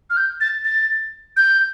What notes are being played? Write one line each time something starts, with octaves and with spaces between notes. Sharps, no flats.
F6
G6
A6
A6
G6